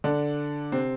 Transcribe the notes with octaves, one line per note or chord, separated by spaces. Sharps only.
D3 D4
C3 C4